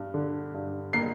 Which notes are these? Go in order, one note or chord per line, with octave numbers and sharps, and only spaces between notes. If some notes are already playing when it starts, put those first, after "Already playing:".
Already playing: G2
D3
G2
A#3 C7